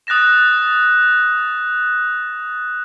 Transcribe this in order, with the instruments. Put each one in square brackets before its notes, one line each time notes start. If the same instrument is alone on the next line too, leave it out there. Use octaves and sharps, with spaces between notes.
[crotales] D#6 F#6 A6 A#6 E7